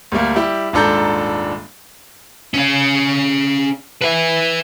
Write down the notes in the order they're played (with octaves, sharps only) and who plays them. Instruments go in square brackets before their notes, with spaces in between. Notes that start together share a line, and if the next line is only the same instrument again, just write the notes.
[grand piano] D2 G3 A3 A#3
G3 E4 G4
D#1 G#2 D4 A4 A#5 G6
[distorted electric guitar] C#4 F5
B4 E5